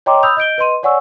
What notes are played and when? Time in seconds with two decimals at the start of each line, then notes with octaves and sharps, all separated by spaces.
0.06 C#5 D#5 G5 A#5 C6 D6
0.23 B5 D#6 E6 G6 F7
0.37 D#5 G6 D7 G7
0.58 B4 D#5 C6 D#7
0.83 C#5 D5 F#5 G#5 C#6 E6